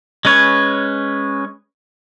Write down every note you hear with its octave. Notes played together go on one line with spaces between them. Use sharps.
G#3 C#4 B4 C#5